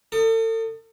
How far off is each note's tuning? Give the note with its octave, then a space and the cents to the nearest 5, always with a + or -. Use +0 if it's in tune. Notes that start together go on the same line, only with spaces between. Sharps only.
A4 +40 D#6 -15